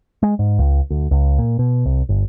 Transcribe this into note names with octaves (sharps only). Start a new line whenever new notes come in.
G#3
G#2
C#2
D2
C#2
A#2
B2
C2
G1